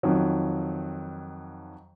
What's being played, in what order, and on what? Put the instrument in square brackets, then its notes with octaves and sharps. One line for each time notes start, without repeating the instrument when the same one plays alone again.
[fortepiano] F2 D#3 F#3